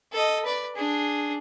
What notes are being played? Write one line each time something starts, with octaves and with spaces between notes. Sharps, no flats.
A4 D#5
B4 D5
D4 G#4